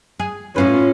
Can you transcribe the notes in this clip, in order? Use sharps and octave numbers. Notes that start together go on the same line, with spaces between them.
G#4
A2 C#4 F4 B4